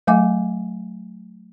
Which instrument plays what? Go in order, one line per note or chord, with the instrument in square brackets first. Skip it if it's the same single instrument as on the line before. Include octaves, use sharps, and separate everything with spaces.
[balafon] F#3 A3 E5 G#5 D6